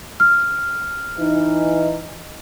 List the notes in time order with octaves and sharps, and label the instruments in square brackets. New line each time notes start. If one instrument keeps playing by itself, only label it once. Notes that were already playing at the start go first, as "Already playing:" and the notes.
[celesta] F6
[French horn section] E3 D#4